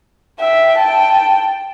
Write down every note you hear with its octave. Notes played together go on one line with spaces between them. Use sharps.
E5 G5
G5 A5